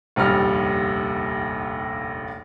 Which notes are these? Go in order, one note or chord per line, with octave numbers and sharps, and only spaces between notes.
F1 A#1 D#2 G3 F6